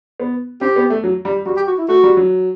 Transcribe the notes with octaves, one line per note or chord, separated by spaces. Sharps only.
B3
C4 G4
B3
A3
F#3
G3
G3 F#4
G4
F#4
E4
A3 F#4
G3
F#3